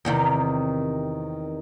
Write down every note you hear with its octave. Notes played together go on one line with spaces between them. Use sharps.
E2 C3 D#3